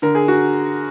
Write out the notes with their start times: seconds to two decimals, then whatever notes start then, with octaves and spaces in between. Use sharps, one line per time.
0.02 D3 A#4
0.15 G#4
0.28 F#4